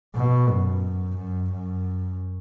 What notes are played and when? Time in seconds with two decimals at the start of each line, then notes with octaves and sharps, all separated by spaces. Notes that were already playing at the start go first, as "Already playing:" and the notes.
0.16 B2
0.49 F#2
1.17 F#2
1.52 F#2